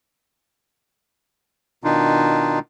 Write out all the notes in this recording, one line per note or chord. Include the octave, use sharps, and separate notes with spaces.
B2 D#3 D4 D#4 F4